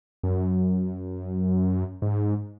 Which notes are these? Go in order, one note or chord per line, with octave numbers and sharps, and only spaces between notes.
F#2
G#2